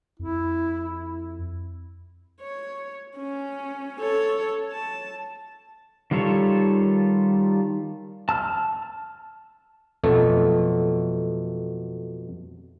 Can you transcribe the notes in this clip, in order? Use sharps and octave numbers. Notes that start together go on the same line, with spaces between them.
F2 E4
C#5
C#4
A4 C#5
A5
D#3 G3 F4 A4 C#5
A5 E6 F6
F2 B2 F#3 A3